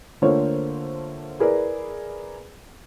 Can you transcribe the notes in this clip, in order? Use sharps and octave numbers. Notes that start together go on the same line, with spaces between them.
D3 A3 A#3 F4 C5 C#5
E4 G#4 A#4 B4 D5